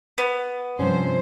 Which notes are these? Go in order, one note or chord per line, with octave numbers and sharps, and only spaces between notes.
B3
G2 C3 F3 C#4 C5